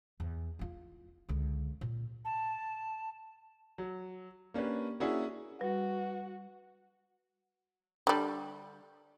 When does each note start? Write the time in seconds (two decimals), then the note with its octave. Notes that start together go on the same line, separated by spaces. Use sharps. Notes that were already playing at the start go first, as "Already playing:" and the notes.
0.20 E2
0.59 E4 F4
1.29 C#2 D3
1.81 A#2
2.25 A5
3.78 F#3
4.54 A#3 C#4 D4 G4 B4
5.00 A#3 C#4 D4 E4 F#4 G#4
5.61 G3 F#4 B4
8.07 D3 G3